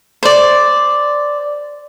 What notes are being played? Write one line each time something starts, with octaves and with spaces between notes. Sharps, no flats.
C5 D5